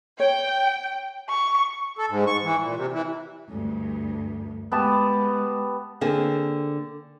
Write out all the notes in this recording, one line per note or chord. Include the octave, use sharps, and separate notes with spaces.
C#5 G5
C#6
A4
G#2
C#6
E3
A#2
C3
E3
D2 G2
G#3 B3 G4 A5
D3 A#3 C4 G#4